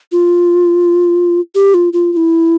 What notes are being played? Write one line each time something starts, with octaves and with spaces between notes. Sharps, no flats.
F4
G4
F4
F4
F4
E4